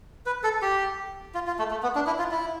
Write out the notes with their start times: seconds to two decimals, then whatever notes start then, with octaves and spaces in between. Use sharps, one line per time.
0.26 B4
0.44 A4
0.62 G4
1.34 F4
1.47 F4
1.59 A3
1.71 A3
1.83 B3
1.95 D4
2.07 E4
2.19 F4
2.31 E4